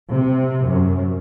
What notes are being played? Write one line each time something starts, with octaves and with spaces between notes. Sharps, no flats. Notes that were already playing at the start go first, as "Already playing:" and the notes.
C3
F#2